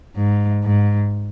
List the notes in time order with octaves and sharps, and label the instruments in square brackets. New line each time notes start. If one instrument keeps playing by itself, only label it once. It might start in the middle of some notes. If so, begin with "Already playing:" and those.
[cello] G#2
G#2